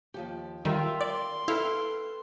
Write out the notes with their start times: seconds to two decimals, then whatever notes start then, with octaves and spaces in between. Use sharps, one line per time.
0.14 D#2 F3 G4
0.65 D#3 G3 F4 A#4 E5 G5
1.01 D5 C6
1.48 E4 A4 B4 F5 G5